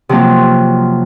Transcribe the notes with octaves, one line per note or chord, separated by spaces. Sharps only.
C3 F3 F#3 A#3 C4 F4